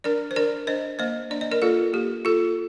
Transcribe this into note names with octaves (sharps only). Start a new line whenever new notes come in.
D4 A#4 D5
C5
D4 A#4 D5
D4 C5 D#5
A#3 C5 D#5
D4 D5
D#5
A#4 D5
A#3 F4 A4
A#3 G4
F4 A4